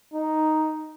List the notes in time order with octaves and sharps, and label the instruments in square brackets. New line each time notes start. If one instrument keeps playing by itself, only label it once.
[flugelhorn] D#4